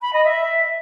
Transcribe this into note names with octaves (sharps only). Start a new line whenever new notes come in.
B5
D#5
E5